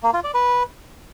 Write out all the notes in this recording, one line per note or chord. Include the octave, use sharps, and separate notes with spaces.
A#3
F4
D5
B4